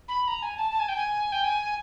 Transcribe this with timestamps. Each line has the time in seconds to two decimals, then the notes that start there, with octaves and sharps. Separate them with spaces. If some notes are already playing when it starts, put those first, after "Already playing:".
0.08 B5
0.28 A#5
0.42 G#5
0.57 A5
0.72 A5
0.80 G#5
0.88 G5
0.97 G#5
1.32 G5
1.44 G#5